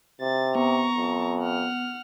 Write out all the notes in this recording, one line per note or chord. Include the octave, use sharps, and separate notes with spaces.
C3 A6
B3 A#5 C#6
F2
F#5 F6